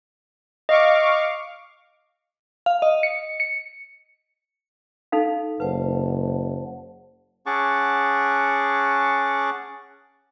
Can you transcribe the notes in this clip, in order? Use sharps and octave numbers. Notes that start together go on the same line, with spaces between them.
D#5 F5 C#6 D6
F5
D#5
C#7
C#7
D#4 A4 F5
F#1 B4 C5 F#5 A5
C#4 G#4 F#5 A5 C#6 D6